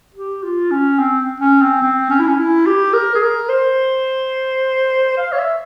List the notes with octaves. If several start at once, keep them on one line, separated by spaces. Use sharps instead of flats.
G4
F4
C#4
C4
C#4
C4
C4
C#4
E4
C#4
E4
G4
A#4
G#4
A#4
C5
F5
C#5
E5